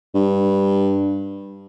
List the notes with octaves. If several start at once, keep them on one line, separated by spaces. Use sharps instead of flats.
G2